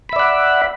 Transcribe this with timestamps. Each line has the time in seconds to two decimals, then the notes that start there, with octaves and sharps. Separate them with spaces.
0.09 B5
0.13 E5
0.16 D5
0.19 F#5